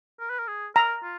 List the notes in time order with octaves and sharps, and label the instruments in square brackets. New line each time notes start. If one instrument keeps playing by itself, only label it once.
[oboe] A#4
B4
A#4
G#4
[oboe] A#4 [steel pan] A#5
[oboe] F4